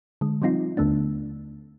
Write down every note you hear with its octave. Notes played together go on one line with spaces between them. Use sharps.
D3 G#3
F3 G3 C4 D#4 F4
D#2 D3 A3 B3 D4